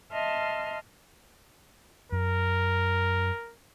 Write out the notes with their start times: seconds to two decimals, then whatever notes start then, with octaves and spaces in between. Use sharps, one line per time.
0.11 D#5 E5 A5 C6 F6
2.12 F#2 A#4